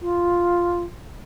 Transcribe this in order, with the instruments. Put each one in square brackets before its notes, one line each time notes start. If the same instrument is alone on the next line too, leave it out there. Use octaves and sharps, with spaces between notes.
[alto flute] F4